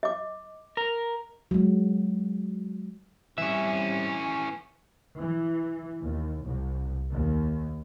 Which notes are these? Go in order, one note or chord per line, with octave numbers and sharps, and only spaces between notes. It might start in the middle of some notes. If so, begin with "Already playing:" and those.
D#5 D6
A#4
F#3 G#3
E3 G3 C4 C#4 E5
E3
D#2
C2
D#2